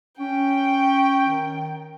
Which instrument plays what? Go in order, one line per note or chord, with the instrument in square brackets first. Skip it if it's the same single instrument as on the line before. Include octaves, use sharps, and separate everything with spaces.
[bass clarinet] C#4 [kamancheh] G5
[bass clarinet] D#3